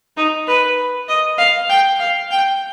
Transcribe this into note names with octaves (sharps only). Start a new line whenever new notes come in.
D#4
B4
D#5
F5
G5
F5
G5